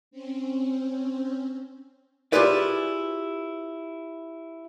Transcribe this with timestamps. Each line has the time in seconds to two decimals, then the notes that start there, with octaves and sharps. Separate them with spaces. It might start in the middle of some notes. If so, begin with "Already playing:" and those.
0.11 C4 C#4
2.32 E4 F4 G4 G#4 B4 D5